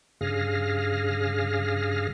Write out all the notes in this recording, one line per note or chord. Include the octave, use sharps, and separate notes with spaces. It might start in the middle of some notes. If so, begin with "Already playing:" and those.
G2 C#3 G#4 F5 F6 A#6